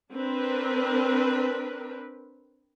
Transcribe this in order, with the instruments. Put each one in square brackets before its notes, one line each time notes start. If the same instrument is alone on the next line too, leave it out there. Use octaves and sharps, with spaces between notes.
[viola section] C4 D4 A#4 B4